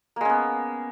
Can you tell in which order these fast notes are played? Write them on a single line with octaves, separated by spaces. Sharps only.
A#3 G#3 C#4 B3